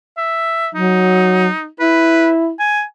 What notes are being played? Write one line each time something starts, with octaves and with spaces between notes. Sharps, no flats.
E5
F#3 D#4
E4 B4
G#5